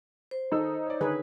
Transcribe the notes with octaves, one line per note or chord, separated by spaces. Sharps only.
C5
D#3 D#4 A4 E6
C#5 D5
D3 D#3 G#4 B4 C#5